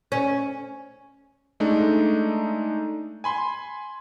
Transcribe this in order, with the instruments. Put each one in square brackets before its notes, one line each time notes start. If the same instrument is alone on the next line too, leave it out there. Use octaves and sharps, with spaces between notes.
[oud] C#4
[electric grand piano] G#3 A3 D4 D#4
G#5 B5 C6